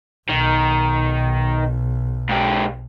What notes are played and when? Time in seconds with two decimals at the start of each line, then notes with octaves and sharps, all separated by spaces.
0.29 B1 D#3
2.29 G#2 G4